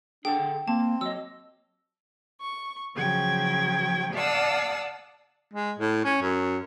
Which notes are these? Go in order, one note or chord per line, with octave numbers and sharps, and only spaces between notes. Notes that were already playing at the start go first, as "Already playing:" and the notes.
D4 G#4 A4 F#5 G5
D3
A#3 C4 A5
F#3 D#5 E6
C#6
C#3 F3 F#3 G5 G#6
D5 F5 F#5 A5 D#6 E6
G#3
A2
C#4
F#2